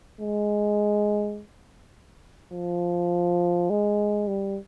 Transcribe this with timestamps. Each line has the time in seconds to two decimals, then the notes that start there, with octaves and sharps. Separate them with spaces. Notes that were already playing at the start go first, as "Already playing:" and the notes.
0.21 G#3
2.53 F3
3.70 G#3
4.28 G3